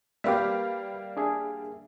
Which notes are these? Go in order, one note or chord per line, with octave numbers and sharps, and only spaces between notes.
G3 A#3 G4 B4 E5 F5
D4 G#4 E5